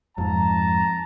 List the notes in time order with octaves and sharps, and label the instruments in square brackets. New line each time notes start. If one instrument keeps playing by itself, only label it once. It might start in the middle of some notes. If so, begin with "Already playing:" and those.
[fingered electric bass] F2 G#2 [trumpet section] A5 A#5